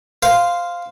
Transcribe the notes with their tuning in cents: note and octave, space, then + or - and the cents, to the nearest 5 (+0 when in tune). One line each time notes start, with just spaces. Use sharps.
C5 -10 F5 +0